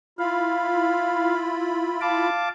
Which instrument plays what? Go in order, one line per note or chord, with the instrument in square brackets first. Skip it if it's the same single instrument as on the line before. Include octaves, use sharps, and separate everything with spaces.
[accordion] E4 F4 B5 [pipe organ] F5
[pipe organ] F5 A5 D6